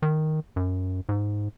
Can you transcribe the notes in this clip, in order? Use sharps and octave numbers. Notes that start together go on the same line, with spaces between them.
D#3
F#2
G#2